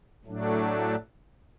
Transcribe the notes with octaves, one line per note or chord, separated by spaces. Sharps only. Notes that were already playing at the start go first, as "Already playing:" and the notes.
A2 F#3 A3 D4